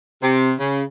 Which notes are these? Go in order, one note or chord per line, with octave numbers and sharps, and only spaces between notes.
C3
C#3